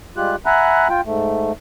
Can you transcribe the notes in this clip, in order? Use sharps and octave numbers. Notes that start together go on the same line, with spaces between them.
G3 G#3 F4 G4 F#6
E5 F#5 G#5 A#5 B5 F#6
F4 G5
G#2 A3